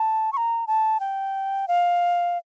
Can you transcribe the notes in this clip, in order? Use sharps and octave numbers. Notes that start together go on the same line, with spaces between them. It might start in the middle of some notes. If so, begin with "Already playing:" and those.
Already playing: A5
C#6
A#5
A5
G5
F5